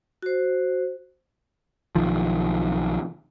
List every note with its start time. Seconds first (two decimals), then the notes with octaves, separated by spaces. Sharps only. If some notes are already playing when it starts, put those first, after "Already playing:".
0.22 F#4 C5
1.95 B1 D#3 F3